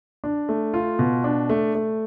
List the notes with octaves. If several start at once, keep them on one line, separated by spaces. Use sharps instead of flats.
D4
A3
F4
B2
D4
A3
A3